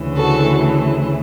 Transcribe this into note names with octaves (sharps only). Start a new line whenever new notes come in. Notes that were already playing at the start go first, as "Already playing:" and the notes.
Already playing: D2 C#3 E3
F#4 A4